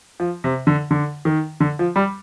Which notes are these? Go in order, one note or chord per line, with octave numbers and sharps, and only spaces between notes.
F3
C3
D3
D3
D#3
D3
F3
G3